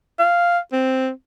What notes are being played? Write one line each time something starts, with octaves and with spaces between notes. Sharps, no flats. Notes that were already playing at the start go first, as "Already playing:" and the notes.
F5
C4